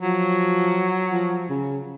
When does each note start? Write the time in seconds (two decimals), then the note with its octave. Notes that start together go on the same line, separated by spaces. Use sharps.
0.02 F3 F#3
1.12 F3
1.49 C#3